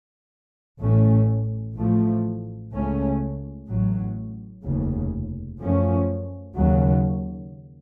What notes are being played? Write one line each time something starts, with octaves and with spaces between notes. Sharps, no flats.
A1 A2 A3 C#4
A1 A2 F3 A3
C#2 C#3 A3 C#4
A1 A2 F#3
F1 D#2 C#3
F#2 F3 A3 C#4
D#2 C#3 F#3